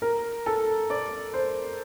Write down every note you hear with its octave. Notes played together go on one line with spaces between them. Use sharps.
A#4
A4
D5
C5